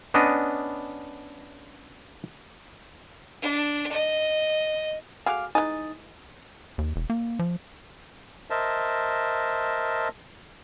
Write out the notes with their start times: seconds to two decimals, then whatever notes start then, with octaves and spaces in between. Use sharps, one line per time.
0.14 B3 C#4 D4 D#5
3.42 D4
3.92 D#5
5.26 A3 F#4 G#4 F5 D6 F6
5.55 E3 G#3 D#4 G#5 D#6 A6
6.78 D#2
6.96 E1
7.10 A#3
7.39 F3
8.50 A#4 C5 D#5 E5 A5